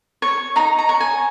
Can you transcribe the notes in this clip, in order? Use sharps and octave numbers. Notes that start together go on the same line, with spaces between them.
C#5
D#4 A#5
A#5
C#5
G#5